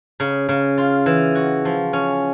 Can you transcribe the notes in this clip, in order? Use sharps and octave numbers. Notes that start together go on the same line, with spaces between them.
C#3
C#3
F4
E3
F#4
F3
C#4